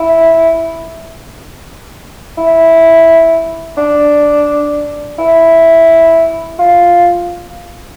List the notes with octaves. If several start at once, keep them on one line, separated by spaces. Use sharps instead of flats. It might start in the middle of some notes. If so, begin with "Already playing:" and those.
Already playing: E4
E4
D4
E4
F4